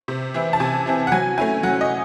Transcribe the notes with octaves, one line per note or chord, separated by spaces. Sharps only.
C3
E3 C4 E4
A5
C3 G#5
E3 C4 E4
F#5
F#3 G#5
A3 C#4 E4 G#5
F#3 F#5
D#5